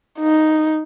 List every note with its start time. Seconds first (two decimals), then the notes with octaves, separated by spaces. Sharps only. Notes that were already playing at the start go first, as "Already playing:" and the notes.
0.19 D#4